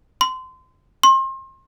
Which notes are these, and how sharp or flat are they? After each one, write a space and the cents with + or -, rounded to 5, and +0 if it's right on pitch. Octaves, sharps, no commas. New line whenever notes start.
C6 -25
C6 +35